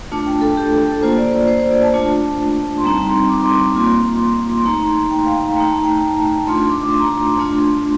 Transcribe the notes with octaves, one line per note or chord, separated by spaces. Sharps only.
A3 D4 F4 A5
G5
A4
G4
A4
A4
A#3 F4 C5
D5
C5
C5
C5
D5
A5
A3 D4 F4
C6
G3 C4 D#4 A#5
C6
D6
C6
D6
A#3 F4 C6
C6
A3 D#4 A#5
G5
F5
G5
A3 D#4 A#5
A5
G5
A5
A3 D4 F4 C6
C6
D6
D6
C6
A#5
C6
A3 D4 F4